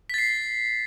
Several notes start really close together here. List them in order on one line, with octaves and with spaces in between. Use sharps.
B6 A6 C7